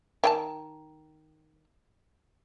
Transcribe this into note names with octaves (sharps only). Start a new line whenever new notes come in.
D#3 G5 A5